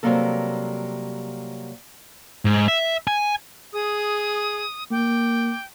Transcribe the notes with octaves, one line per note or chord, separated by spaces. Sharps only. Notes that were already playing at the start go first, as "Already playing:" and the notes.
C3 E3 F#3 G3 A#3 A4
G#2
E5
G#5
G#4 D#6
A#3 G5 D6